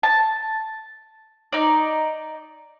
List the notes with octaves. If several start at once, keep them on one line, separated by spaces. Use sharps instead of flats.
A5
D#4 D5